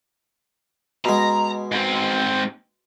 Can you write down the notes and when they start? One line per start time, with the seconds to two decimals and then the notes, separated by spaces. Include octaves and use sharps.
1.05 B2 G#3 A#5
1.72 G#2 C4